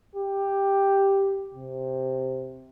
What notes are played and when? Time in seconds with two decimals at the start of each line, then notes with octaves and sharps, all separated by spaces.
0.15 G4
1.54 C3